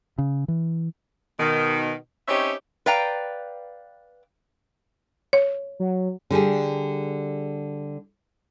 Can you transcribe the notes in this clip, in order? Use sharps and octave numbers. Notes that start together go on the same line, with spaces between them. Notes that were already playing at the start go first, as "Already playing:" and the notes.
C#3
E3
B2 D#3
C4 C#4 D#4 G4 C#5 E5
B4 D5 F5 G5 A#5
C#5
F#3
D3 G3 G4 G#4